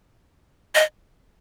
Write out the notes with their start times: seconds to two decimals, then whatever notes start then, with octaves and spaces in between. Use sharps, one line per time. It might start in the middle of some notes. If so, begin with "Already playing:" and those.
0.75 D#5